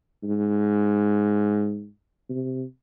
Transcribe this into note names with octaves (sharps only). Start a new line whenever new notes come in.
G#2
C3